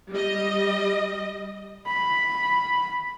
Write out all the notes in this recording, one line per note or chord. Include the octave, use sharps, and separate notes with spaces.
G3 D#5
B5